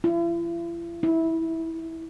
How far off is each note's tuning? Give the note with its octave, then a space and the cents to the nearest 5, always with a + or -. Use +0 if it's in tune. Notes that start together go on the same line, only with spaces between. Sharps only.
E4 +45
E4 -15